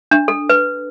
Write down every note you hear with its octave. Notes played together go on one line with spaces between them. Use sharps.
D4
A4
B4